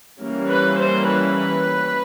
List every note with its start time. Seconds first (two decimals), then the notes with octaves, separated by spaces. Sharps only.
0.21 E3 G3 A#3 C#4
0.50 B4
0.78 C5
1.07 B4